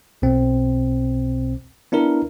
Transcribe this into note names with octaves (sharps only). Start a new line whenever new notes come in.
B1 B2 C4
B3 D4 E4 A#4